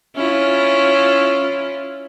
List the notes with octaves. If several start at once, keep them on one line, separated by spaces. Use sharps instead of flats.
C#4 E4 F4